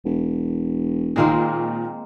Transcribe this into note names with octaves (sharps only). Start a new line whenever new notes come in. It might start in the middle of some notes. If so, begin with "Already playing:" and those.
E1
A#2 D#3 G#3 A#3 C4